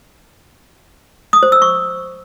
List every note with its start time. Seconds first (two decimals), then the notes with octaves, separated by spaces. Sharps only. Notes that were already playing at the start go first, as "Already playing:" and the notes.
1.33 D#6
1.43 C5
1.52 E6
1.62 C#6